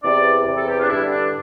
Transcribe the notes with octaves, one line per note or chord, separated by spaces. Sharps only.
E2 C3 E3 D5
E2 C3 E3
A4
G4
F4
D4
G2 D3 E4
D4